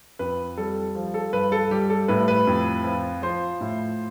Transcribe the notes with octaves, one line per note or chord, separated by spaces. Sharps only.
F2 B4
G3 A4
F3
A4
G2 B4
A4
G3 G4
A4
A2 B4
B4
F2
F3
F3 C5
A2